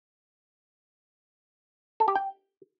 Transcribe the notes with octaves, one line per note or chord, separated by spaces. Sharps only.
A4
G4
G5